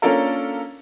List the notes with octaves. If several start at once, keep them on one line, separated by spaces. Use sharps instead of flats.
A#3 C#4 D4 F4 A4 A#4